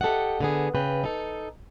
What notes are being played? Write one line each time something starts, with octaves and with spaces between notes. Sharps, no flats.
G4 A4 D5 D#5 F#5
D3 B3 G#4
C#3 B4 G5
D#4 A4